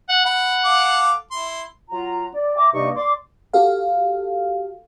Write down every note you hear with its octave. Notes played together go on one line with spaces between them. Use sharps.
F#5
F#5 B5
A4 F5 D6
E4 C6
F#3 F4 F#5 A#5
D5
E5 G5 A#5 D6
G2 C3 A#3 D#4 D5 C#6
D5 C6 D6
F#4 G4 A4 F5